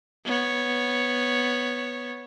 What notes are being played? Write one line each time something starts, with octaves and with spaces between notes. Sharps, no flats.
B3 C#5